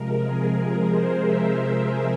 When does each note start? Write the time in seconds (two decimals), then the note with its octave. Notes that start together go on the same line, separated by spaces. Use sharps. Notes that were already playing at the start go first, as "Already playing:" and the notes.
Already playing: C3 F3 G#3 A#4
0.22 G#4
0.55 A#4
0.88 C5
1.21 E5